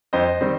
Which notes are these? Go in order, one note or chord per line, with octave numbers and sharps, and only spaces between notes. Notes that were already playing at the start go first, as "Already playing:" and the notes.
F2 C5 D#5
D#3 G3 C4